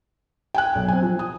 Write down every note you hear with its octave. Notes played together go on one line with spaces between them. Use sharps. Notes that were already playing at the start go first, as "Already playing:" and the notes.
G5 G#5 F#6
B1
C4 G#5
F3
D#6